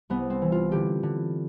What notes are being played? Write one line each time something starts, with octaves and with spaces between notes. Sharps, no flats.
C2 B3
C4
E3
F4
D3 G4
D3